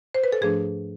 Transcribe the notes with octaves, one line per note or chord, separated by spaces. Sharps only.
C5
B4
A4
G#2 F3 A3 D4 G#4